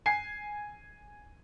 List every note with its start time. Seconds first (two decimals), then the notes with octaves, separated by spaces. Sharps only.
0.06 G#5 C7